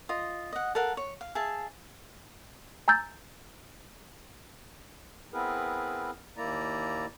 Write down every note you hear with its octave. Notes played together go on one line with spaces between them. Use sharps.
F4 D#5
D#5 F#5
A4 A#4 F5 F#5
C#5
F5
G#4 E5 F5 A5
G#5 A#5 E6 G6 A6
B3 C4 E4 G#4 A#4 B4
D#2 A#3 E4 D5 A#5